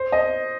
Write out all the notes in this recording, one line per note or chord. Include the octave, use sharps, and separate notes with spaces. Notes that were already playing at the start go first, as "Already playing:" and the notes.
Already playing: C5
D#5